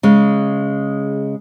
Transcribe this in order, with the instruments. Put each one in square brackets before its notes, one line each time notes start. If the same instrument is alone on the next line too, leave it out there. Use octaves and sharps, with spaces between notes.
[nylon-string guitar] C#3 G#3